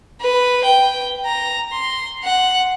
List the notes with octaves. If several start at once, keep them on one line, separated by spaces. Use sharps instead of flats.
B4
G5
A#5
C6
F#5